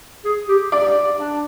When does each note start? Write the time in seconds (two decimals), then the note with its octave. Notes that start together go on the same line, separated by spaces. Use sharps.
0.25 G#4
0.48 G4
0.72 D5
1.18 D4